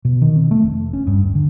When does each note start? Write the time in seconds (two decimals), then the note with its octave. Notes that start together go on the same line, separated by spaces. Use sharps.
0.05 B2
0.22 D#3
0.36 C4
0.51 A3
0.62 F1
0.93 C#4
1.07 G2
1.22 D1
1.35 D3